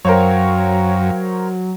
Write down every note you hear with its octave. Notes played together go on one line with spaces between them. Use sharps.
F#2 F#3 A#4 C5 C#5 F5 G5